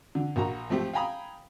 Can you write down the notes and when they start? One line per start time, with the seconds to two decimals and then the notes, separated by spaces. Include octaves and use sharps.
0.15 D3
0.36 A#1 F#4 A#5
0.70 F3 A3 C4 G4
0.93 F5 G5 G#5 A#5 B5 D#6